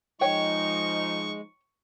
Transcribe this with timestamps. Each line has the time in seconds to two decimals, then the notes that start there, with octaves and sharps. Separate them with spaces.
0.21 F3 G#3 D#4 C#5 G5 C#6